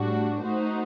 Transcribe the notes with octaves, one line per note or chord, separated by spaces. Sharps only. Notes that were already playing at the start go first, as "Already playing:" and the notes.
Already playing: A2 G3 D4 F#4
A3 D#4 F#4 C5